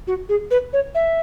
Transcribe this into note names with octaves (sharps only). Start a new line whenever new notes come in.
F#4
G#4
B4
C#5
E5